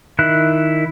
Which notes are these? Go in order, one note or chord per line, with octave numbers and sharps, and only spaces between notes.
D#3 E4 F#6